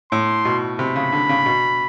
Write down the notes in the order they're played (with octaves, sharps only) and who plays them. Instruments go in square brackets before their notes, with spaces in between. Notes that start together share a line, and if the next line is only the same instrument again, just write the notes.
[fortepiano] A2 [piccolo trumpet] C6
[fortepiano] B2
[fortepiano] C3 [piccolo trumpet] B5
[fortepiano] C#3
D3
C#3
B2